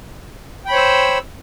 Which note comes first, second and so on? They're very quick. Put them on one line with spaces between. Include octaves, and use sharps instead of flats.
G5 B5 C#5 C5 E6